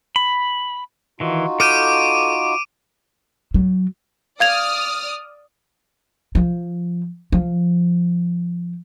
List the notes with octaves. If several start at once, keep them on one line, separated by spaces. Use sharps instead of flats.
B5
D#3 E3 D#4 F4 F#4
A4 D6 F6 G6 D7 D#7
F#3
D5 F5 D#6 F6 G#6 F7
F3
F3